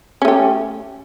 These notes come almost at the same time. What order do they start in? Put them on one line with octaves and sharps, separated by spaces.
C#4 A3 G4